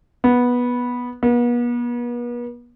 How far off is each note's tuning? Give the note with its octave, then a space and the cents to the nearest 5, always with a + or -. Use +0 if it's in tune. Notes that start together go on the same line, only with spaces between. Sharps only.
B3 -10
B3 -40